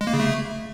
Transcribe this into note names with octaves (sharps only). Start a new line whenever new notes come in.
G#3
A#3
C#3
A3